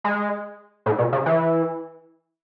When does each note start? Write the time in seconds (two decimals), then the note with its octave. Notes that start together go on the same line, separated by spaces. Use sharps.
0.04 G#3
0.86 A2
0.98 B2
1.12 C#3
1.26 E3